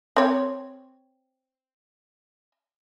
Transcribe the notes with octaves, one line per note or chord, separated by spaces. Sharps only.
C4 C#5